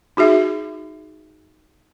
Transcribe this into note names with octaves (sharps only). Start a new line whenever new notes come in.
D#4 F#4 G#4 E5